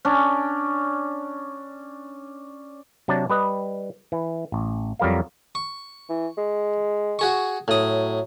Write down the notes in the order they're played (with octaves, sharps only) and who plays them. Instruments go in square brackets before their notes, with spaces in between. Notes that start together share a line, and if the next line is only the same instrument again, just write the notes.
[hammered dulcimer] C#4 D4
[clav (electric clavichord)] C3 F#3 D4 D5 A5
G3 B4 D#5
E3
A1
F2 F#3 G3 A#4 F5
[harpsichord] C#6
[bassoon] E3
G#3
[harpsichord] F#4 G#4 C#6
[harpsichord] A2 D#6 [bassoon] F#3